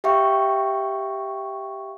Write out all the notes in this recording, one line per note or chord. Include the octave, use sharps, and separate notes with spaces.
G4 E5 F5 G5 C#6